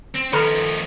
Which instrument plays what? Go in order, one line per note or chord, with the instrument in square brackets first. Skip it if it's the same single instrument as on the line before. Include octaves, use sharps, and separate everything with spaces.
[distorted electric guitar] C4
[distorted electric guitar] D#3 F3 [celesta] A4 [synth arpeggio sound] B4 A#5 F6